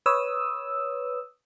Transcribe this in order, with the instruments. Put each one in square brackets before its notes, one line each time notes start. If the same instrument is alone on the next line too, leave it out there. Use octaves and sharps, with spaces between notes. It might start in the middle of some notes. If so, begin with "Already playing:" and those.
[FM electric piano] B4 C#5 D#6 E6